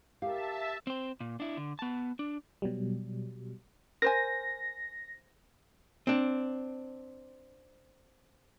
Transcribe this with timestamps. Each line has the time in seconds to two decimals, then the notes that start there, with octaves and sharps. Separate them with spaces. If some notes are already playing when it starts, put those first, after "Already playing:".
0.22 G4 A#4 E5 F5 A5
0.87 C4 C5
1.20 A#2
1.40 D4 E4
1.57 D3
1.79 B3 A5
2.19 D4
2.62 B2 F#3 G3
4.02 A#4 C5 G#5 A#6
6.07 C4 D4